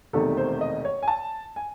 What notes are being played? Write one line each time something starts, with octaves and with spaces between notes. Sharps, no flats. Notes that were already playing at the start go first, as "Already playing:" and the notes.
E1 E2 C3 D#3 A3 A4
C5
D#5
C#5
G#5
A5
G#5